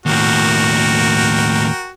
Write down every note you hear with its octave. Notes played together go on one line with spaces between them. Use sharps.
D#2 A2 F#4 A#4 G5